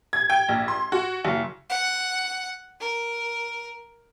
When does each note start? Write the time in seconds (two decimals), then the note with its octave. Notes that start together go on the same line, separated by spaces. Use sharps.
0.13 G#6
0.30 G5
0.49 A#1
0.68 C6
0.92 F#4
1.25 F#1
1.70 F#5
2.80 A#4